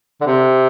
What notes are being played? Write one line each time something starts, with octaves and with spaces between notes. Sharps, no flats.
D3
C3